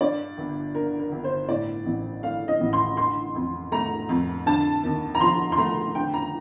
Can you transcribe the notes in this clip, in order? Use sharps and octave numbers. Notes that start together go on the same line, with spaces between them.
G2 D5
G1
D3 A#4
A#4
G1
C5
A2 D5
A1
A3 F5
D#5
A1
C6
D3 C6
F2
A3 A#5
F2
D3 A5
D#2
A#5
F3 C6
C6
A3 A#5
D3 G5
A#5